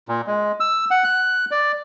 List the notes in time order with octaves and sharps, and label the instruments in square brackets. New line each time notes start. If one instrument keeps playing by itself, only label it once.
[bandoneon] A#2
G#3
E6
F#5
F#6
D5